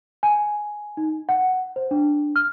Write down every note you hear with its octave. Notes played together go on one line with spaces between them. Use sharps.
G#5
D#4
F#5
C5
D4
F6